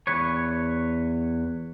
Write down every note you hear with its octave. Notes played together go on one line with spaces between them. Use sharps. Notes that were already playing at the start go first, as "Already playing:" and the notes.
E2 B4 C#5